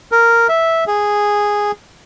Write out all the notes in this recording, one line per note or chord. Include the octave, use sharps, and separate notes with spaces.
A#4
E5
G#4